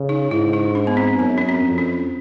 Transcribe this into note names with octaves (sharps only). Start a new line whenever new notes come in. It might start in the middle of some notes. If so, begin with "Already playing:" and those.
Already playing: C#3
D#4
G#2 E4
D#4
D4
B3
C4
F#2 B3
C#4
C4
F2
C#4